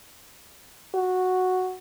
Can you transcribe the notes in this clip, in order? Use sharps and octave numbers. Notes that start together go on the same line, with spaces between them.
F#4